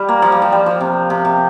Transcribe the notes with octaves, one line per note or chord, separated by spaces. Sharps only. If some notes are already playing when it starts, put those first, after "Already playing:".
Already playing: G3
A#3
F3
G3
F3
G3
F3
C3
C3
C3